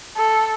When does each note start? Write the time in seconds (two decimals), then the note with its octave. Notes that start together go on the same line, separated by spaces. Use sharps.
0.17 A4